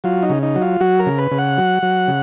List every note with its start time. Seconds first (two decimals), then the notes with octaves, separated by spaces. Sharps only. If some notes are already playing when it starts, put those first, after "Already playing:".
0.04 F#3 F4
0.23 D#4
0.29 C#3
0.43 D#4
0.55 F#3
0.61 F4
0.80 F#3 F#4
0.99 A#4
1.06 C#3
1.18 B4
1.31 C#3
1.38 F#5
1.58 F#3
1.83 F#3
2.08 C#3